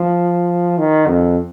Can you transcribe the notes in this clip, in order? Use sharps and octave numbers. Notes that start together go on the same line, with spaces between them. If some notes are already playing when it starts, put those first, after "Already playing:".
Already playing: F3
D#3
F2